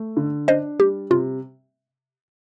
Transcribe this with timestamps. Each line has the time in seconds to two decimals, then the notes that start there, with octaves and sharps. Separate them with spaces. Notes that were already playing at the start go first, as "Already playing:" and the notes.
Already playing: A3
0.17 D3
0.48 D4 C5 D#5
0.79 G3 G4
1.10 C3 F4